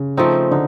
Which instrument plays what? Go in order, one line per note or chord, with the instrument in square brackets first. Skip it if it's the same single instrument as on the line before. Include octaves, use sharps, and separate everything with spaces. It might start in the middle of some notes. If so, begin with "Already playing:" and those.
Already playing: [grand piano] C#3
[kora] F3 A3 C4 D#4
[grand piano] D3 [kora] D#4